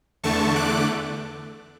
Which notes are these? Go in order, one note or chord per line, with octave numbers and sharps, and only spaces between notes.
E2 D3 A3 A5 C#6
D6 F#6